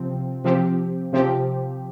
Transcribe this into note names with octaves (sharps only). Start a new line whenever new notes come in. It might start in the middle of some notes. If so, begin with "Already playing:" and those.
Already playing: C3 F3 C4
C3 F3 C4 G4
C3 F3 C4 G4